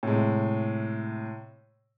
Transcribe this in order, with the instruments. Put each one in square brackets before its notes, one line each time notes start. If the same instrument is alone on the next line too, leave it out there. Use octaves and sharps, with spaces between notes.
[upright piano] A2 C3 G#3